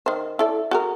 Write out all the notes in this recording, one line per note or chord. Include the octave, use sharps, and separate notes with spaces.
D#3 C5
E4 A4 D5
F#4 G#4 A#4